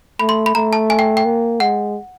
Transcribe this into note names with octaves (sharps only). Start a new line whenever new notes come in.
A3 B5
C6
B5
A3 A#5
A5
G#5
G5
G5
A#3
G#3 F#5